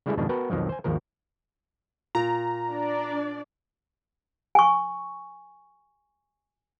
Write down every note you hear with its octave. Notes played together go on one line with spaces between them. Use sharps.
C#3 G3 G#3 E4 G#4 A4
F2 G#2 B2 D#3 D4
B3 F#4 A#4 B4 G5 A5
B1 F2 D#3 F3 F#3
C5 G#5
G#1 D#2 F3 A#4
A#2 A#5
D4 D5
G#5 C#6